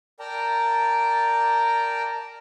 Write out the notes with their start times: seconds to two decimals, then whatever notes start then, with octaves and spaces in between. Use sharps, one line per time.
0.20 A#4 D5 G5 A5 A#5